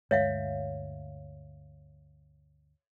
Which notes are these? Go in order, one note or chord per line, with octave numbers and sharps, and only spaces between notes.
D2 G2 G#3 C#5 E5 F5